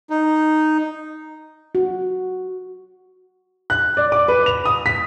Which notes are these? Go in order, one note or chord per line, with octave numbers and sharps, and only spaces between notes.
D#4
F#4
F#6
D5
D6
B4
F7
D#6
B6